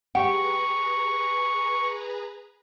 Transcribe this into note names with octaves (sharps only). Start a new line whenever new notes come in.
G4 G#4 B4 F#5 A#5 C#6